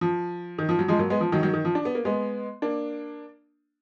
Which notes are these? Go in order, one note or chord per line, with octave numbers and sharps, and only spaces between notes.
F3
D#3
F3
F#3
F3 G#3
F#3 A#3
G#3 B3
F3
D#3 F#3
D#3 F#3
D#3
F3
D4
B3
A#3
G#3 B3
A#3 D4